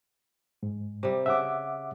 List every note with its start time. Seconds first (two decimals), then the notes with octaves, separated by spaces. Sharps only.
0.63 G#2
1.03 C3 G3
1.26 C#3 E5 F#5 D6